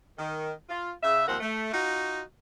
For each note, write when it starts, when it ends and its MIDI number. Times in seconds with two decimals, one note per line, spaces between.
0.18 0.51 51
0.70 0.91 65
1.02 1.25 49
1.02 1.25 76
1.27 1.37 39
1.27 1.37 53
1.27 1.37 60
1.27 1.37 70
1.27 1.37 78
1.40 1.73 57
1.73 2.21 63
1.73 2.21 65
1.73 2.21 66